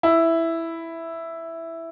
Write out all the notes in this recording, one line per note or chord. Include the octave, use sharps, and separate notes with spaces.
E4